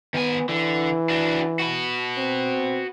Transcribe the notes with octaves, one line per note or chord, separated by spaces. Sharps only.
D#3 B3 G#5
D3 E3
D4 F#4
F#4 B4
C4